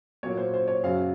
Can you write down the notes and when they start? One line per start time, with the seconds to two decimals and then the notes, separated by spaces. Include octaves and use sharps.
0.23 A#2 F#3 A#3 C#5
0.37 C5
0.54 C5
0.68 C#5
0.83 F#2 C#3 F#3 F5